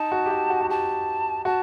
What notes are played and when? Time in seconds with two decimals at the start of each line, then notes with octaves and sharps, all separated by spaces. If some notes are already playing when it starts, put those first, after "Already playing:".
Already playing: D#4 A5
0.12 F#4
0.26 G4
0.31 F#4
0.50 F#4
0.61 F#4
0.70 G4 A5
1.45 F#4 A5